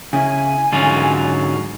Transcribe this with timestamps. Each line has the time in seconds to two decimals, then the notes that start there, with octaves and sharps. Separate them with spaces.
0.13 C#3 C#4 E4 G#5
0.72 G#2 D3 F#3 C#4 F4